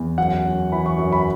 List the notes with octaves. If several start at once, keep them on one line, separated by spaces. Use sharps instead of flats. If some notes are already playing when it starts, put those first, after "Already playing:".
Already playing: E2
F#2 F#5
F#2
E3 B5
C#6
F#2
B5